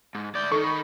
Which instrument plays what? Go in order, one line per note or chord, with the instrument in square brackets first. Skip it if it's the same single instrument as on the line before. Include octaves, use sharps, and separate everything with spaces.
[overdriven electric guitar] G#2
[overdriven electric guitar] D2 D5 [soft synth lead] G6
[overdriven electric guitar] D#3 D#4 [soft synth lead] A4 [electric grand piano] C#6
[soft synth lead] B5